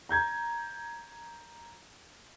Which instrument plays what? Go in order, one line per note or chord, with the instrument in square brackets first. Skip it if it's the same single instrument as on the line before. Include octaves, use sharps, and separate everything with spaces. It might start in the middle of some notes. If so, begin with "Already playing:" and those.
[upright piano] A#5 G6 G#6